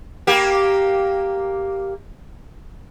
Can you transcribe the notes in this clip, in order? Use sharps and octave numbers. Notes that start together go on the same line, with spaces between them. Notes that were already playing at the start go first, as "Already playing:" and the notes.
A#3 G4